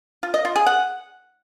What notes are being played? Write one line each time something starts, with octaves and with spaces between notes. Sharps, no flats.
F4
D#5
F4
G#4
F#5